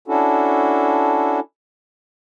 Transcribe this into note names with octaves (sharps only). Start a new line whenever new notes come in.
C#4 D4 E4 F#4 A4